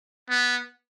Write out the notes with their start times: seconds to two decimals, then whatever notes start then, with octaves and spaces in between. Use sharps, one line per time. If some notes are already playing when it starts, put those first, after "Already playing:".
0.29 B3